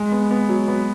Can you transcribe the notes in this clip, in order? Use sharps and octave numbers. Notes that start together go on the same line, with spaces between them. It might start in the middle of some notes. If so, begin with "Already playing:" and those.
Already playing: G#3
B3
B3
F#3
B3